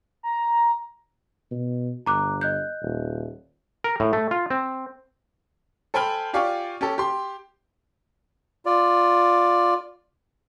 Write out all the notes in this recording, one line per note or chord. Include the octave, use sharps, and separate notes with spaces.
A#5
B2
G1 A#5 D6 F#6
D#5 F#6 G6
D#1
A#4
A2
A3
F4
C4
A4 C5 G5 G#5 B5 F6
F4 G4 D5 F5 G#5 C#6
C#4 G4 A4
G4 C6
F4 D5